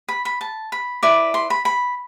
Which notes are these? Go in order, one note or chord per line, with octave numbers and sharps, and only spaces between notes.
B5
B5
A5
B5
E4 B4 D5
C6
B5
B5